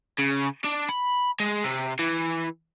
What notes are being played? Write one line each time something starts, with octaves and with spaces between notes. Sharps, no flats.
C#3
D4
B5
G#3
C3
E3